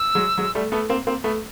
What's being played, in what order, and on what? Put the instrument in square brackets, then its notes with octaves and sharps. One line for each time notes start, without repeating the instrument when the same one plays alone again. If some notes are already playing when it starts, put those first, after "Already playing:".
Already playing: [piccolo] E6
[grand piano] F#3 G#3
F#3 G#3
G3 A3
A3 B3
A#3 C4
A#3 C4
A3 B3